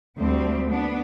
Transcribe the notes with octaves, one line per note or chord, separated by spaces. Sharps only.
D2 G3 C4
B3 D4